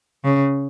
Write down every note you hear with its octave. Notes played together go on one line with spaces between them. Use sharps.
C#3